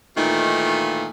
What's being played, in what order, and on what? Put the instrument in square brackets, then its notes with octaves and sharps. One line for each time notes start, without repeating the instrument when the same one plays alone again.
[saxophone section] A#2 D#3 E3 A3 D#4 F4